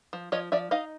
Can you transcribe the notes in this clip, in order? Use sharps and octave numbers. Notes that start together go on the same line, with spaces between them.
F3
F3 C#5 D#5
F3 D5 E5
D#4 D#5 F5